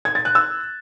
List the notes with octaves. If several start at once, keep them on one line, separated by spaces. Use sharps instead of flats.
G#6
A6
F#6
E6